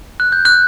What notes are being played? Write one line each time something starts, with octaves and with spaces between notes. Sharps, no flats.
F#6
G6
F#6